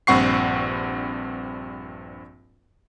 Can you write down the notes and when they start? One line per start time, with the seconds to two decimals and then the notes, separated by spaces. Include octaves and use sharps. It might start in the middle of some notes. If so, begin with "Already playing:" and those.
0.07 A#1 G2 C4 F#5 C#6 C7